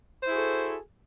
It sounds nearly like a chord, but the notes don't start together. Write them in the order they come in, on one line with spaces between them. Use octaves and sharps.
C5 E4 G#4 F#4 A4